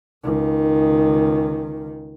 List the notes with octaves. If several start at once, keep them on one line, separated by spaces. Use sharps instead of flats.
C#2 D#3